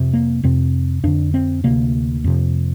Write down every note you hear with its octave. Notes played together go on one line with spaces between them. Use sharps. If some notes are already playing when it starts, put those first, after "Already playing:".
Already playing: F2 C3
A#3
F2 C3 C4
F2 D3 D4
C4
D2 C3 A#3
F2 C3